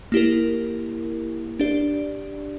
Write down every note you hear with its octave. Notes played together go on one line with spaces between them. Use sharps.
A#3 E4 G4 A#4
D4 G4 D5